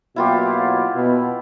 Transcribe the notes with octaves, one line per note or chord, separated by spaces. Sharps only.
B2 F#3 A#3 E4 F4 G4
B2